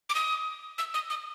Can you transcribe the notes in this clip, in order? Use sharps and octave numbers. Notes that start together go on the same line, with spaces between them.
D6
D#6
E6
D#6
D#6